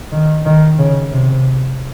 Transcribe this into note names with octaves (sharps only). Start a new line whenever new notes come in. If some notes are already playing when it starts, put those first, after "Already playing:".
D#3
D#3
C#3
C3